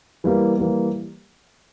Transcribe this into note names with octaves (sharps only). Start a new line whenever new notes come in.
E3 G3 A#3
E3 G3 A#3